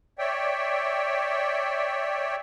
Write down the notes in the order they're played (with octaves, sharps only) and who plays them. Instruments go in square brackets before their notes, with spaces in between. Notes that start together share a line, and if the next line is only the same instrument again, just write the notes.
[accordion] C#5 D5 E5 G5